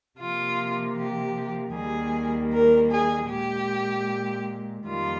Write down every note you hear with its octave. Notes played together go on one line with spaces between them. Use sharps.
C3 F3 A#3 F4
G4
D#2 D#3 G3 A#3 G#4
A#4
G#4
A#2 G#3 G4
F2 D#3 G3 A#3 F4